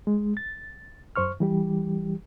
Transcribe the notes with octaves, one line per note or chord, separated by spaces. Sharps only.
G#3
A6
F#2 C5 C#6 F6
E3 G3 G4